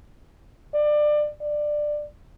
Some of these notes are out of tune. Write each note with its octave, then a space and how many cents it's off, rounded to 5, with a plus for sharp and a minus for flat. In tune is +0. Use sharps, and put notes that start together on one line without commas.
D5 +25
D5 +15